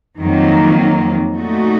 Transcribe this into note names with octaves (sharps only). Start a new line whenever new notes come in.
F2 D#3 F#3 A#3
A#2 A3 D#4 F#4